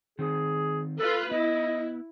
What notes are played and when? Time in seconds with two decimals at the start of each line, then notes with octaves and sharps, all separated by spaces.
0.19 D#3 C4 G#4
0.99 F4 A4 B4
1.31 B3 E4 D#5